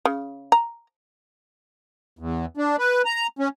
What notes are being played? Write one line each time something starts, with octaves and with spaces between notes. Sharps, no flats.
C#3
A#5
E2
D4
B4
A#5
C#4